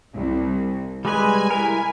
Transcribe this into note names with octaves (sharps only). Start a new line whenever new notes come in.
C2
G3 G#3 B4 G#5
E4 A#4